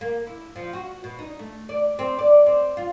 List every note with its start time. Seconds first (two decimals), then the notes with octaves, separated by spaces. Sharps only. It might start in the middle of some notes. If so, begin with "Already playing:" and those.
0.01 A#3
0.27 E4
0.56 F3
0.73 F#4
1.04 B2
1.19 D#4
1.39 A3
1.69 D5
1.99 C4
2.19 D5
2.46 C4
2.77 F4